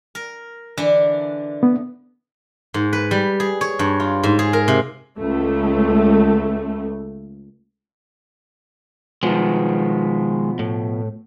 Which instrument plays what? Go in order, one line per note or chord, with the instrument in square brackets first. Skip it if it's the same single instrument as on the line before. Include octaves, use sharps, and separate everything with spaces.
[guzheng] A#4
D3 E3 D4
[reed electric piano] B3
[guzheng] G#2
B4
G3
G#4
C#5
G2
F4
G#2
G#4
A#4
C3
[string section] C#2 A3
[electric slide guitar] B2 F3 B3 [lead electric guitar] D#3 G#3
[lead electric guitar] A2